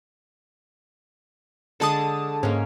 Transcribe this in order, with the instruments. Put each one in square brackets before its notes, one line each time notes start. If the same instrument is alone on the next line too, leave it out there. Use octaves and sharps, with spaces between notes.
[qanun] D3 G#3 D4 [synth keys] A4 A5 D#6
[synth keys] G#2 [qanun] A#3 C#4